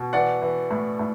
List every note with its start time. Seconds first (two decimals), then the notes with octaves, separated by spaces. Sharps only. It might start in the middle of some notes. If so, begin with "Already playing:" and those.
Already playing: B2
0.13 E3 D5 F#5
0.42 E3
0.71 A2
0.99 A2